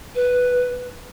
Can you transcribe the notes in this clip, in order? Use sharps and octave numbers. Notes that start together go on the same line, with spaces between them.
B4